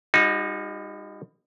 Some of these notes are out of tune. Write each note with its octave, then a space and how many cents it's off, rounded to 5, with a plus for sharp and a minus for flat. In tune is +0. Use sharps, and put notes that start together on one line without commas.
G3 +35 D#4 +0 F#4 -30